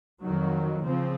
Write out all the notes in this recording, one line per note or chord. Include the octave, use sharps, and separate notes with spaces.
F2 D#3 F#3
C#3 F3 C4